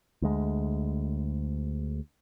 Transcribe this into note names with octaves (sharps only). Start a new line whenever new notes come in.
D2 G#3